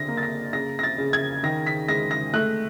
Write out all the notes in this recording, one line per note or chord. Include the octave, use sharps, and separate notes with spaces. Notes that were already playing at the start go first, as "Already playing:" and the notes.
Already playing: D3 A#6
A#3
A6
A#6
C#3 A#6
A#6
A6
C#3
G#6
D#3 A#6
B6
G#3 A#6
A#6
A3 F#6